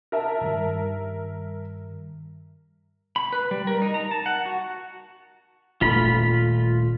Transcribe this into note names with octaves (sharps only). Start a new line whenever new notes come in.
A#4 E5 A5
G2 D#3 G3
B5
B4
G3
A#4
D#4
A#5
A5
F#5
F#4
D#1 A3 F4 B5